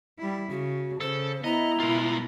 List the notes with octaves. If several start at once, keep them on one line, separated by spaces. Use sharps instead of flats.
G3 E4
C#3 F#4
C#3 A4 C5
B3 E4 D#5 A#5
B2 G#3 F4 A#4